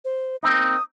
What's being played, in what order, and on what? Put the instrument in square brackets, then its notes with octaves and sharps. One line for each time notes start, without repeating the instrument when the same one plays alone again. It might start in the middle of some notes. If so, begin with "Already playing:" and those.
[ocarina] C5
[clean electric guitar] A#3 C4 D#4 [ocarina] D#6